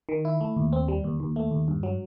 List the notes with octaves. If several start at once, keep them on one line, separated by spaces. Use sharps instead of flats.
D#3
E4
A3
D#2
C4
G3
D#2
D#2
A3
D#2
G2
F#3